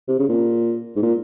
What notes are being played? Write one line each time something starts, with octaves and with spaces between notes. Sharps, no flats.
C3
C#3
A#2
G#2
A#2